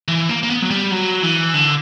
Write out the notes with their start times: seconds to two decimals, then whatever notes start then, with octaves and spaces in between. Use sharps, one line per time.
0.08 E3
0.29 A#3
0.43 A#3
0.50 B3
0.62 F#3
0.71 G3
0.91 F#3
1.23 E3
1.54 D3